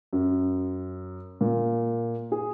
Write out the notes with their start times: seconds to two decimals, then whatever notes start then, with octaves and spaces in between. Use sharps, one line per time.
0.13 F#2
1.41 A#2
2.32 G#4